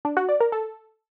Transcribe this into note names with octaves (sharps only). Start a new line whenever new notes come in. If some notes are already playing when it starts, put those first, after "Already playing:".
D4
F#4
D5
A#4
A4